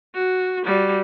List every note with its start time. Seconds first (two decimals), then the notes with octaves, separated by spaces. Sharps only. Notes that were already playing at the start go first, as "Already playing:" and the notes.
0.14 F#4
0.65 G3 F#4